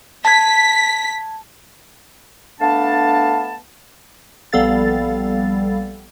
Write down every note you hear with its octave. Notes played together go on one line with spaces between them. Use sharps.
A5 G#6 B6
A3 B3 D4 F5 A5
A#1 G3 B3 A4 F5 A6